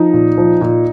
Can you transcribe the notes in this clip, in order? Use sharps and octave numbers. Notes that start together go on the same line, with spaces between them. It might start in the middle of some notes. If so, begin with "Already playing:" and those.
Already playing: F3 D#4
A#2
F3
A#2